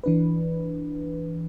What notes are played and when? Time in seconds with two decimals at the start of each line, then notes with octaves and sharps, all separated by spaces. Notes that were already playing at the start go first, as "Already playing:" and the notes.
0.04 E3 D4 B4